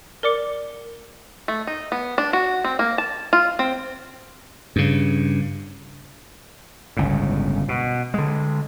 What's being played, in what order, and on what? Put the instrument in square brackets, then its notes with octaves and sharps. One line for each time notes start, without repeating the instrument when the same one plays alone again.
[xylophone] A#4 D5 D6 C#7
[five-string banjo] A3
D#4
B3
D4
F#4
C4
A#3
A5
F4
C4
[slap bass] G2 C#3
G1 C#2 A2
B2
D3 G#3